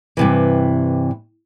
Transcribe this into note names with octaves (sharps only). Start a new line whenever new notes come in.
G2 C3 E3